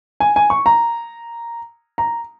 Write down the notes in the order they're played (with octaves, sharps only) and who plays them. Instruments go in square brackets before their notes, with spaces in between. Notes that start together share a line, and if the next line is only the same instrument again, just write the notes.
[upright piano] G#5
G#5
C#6
A#5
A#5